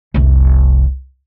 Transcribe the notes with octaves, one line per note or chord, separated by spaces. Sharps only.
F1 C2